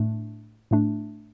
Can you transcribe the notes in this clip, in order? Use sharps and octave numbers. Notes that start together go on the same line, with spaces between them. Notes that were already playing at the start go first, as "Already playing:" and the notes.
Already playing: A2 A3 D4
A2 A3 D4